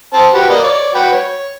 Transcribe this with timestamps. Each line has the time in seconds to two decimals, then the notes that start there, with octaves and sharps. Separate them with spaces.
0.14 C4 A5
0.34 F#4 G4 B4
0.50 A#3 D5 D#5
0.64 C#5 D5
0.94 F#4 B4 G5
1.12 C#5